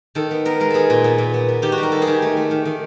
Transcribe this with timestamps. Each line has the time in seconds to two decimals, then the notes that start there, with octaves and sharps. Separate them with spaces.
0.15 D#3 A4
0.31 B3
0.45 B3 A#4
0.60 G#3 A#4
0.70 B3 G#4 A4
0.90 A#2
1.04 B3
1.18 A#2
1.34 B3
1.49 B3
1.62 D#3 G4
1.72 F#4
1.78 G3
1.83 A#4
1.92 D#3 A4
2.02 G#4
2.07 D#3
2.12 G4
2.22 A3
2.37 A3
2.51 D#3
2.65 D#3